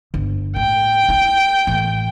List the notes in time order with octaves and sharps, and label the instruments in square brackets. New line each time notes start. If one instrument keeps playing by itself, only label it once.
[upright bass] G1
[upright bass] A2 [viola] G5
[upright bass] E4
A1